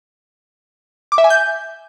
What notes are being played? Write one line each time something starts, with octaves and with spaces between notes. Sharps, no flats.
D6
E5
G#5
G6